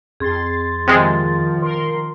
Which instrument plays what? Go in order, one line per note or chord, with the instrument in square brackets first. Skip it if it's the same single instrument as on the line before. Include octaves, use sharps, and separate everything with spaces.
[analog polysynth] F2 C6 A6 [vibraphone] G#4
[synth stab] C3 G#3 [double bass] D#3 F3
[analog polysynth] A#4 C6